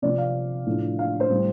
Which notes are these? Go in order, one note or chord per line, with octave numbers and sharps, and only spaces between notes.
C3 F3 C4 D5
F5
A2 F3 A3 D4
F5
C5
A2 G3 C4